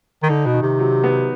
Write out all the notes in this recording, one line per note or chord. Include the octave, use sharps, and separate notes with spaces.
D#3
D3 D#4
B2
D#3
C3
F#3
B3